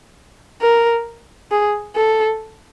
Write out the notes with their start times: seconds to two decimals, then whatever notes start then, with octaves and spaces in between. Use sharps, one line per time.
0.61 A#4
1.51 G#4
1.96 A4